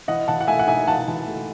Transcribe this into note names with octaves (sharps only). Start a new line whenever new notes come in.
E3 D#5 F#5
E3 F#5 A5
F#5
A3 E5 G#5
F#5
D#4 E5 G#5
E3 F#5 A5
E3
A3